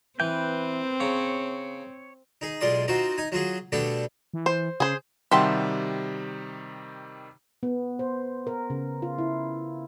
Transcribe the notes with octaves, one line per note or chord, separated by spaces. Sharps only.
E3 C4 B4 G5
C#3 C#5 A#5
D#4 G#4
B1 G#3 F4 D5 C6 D#6
C4 D#4 F4 F#4 C5
D#4 G#5
F#3 F4 F#4 G#4
B2 G3 A3 B3 D4 A4
E3
C5
C#3 G#4 C5
C3 D#3 G3 F#4 E5 G5 A5 C6
B3
C5
A#4
C#3
F4
E4